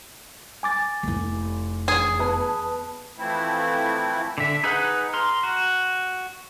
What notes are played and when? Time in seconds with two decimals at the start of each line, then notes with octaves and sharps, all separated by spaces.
0.63 G#5 D6 A6
1.03 F1 E4
1.88 E2 G#4 G#6
2.19 B3 B4 A5
3.18 E3 F3 A3 C4 E4
4.38 D3 E5
4.64 D#4 G#4 B4 F#5
5.13 A#5 C6 F6
5.43 F#4